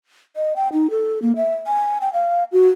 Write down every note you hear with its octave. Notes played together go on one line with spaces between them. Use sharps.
D#5
G5
D#4
A4
A#3
E5
G#5
G5
F5
F#4